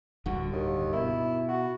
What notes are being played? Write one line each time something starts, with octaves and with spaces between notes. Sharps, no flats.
D1 G2 D3 F#4
D#2
B2 E4
F#4